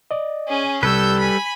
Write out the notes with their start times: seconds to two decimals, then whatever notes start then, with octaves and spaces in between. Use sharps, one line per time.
0.11 D5 D#5
0.48 C#4 G#4
0.83 C2 G3 A4 B4 E6 G6 G#6
1.19 G#5 B5